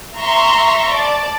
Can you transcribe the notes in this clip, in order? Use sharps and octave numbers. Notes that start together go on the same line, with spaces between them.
E5 A#5 C6 C#6
D5 A5